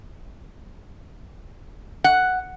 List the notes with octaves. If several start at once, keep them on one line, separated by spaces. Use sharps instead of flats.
F#5